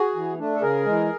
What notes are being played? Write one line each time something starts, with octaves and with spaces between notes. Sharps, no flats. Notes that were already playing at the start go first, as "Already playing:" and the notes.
Already playing: F#4 G#4
E3
A3 D4
A4
C#3 G#4 A#4
E3 G#3